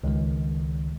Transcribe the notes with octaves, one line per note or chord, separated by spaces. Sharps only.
C#2 D#3 G#3